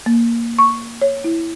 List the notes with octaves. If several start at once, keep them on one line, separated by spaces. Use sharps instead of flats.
A#3
C#6
C#5
E4